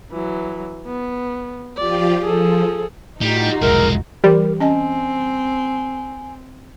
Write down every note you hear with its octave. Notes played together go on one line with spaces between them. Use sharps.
E3 F#3
B3
F3 F4 G4 D5
F3 G#4 A4
A2 G3 D#4 F4 F#4
F1 B1 G#3 A#4 E5
E3 G3 A#4
C4 C#4 D#5 G#5 A5